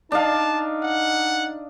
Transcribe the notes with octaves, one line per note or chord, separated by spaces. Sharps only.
D4 D#4 D#5 F5 A5
F#5